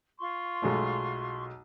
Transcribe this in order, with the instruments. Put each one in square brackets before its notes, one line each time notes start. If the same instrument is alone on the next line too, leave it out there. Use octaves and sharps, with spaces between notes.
[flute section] F4 C6 C#6
[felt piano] B1 G#3 A3